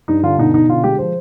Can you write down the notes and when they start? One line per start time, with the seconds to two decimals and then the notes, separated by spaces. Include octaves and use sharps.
0.08 G2 D#4
0.23 D3 F4
0.38 B2 D#4
0.54 B2 D#4
0.69 D3 F4
0.84 G#3 G4
0.98 F3 C5